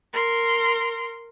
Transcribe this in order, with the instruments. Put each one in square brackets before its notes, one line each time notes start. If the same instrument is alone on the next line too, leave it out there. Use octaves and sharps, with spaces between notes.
[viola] A#4 C6